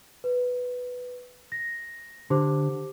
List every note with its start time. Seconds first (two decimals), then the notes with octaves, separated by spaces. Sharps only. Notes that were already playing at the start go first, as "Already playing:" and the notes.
0.24 B4
1.52 A#6
2.30 D3 G4 C5 D6